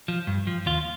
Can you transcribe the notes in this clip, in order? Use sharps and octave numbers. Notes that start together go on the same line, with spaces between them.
F3
G2
F3
D#2 F4